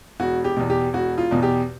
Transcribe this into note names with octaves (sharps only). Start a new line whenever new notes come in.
E1 F#4
G4
E2 B2
G4
E1 F#4
F4
E2 B2
G4